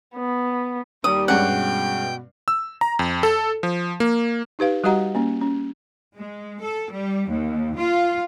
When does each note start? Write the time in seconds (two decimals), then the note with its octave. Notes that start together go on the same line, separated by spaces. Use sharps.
0.15 B3
1.04 D#2 G3 D#6
1.28 G2 G#3 C#4 F#5 G5
1.47 B2
2.48 E6
2.81 A#5
2.99 F2
3.23 A4
3.63 F3
4.00 A#3
4.59 D#4 G4 B4 F5
4.84 G3 F#4 G4 D#5 F#5 A#5
5.15 A#3 C#4
5.41 C#4
6.17 G#3
6.62 A4
6.91 G3
7.29 D#2
7.77 F4